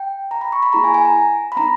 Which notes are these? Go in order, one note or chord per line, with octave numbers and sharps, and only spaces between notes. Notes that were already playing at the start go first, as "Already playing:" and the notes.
Already playing: G5
A#5
B5
C#6
B5
A#3 E4 G#4 A#5
G#5
G#5
A#5
B5
B3 D#4 A#5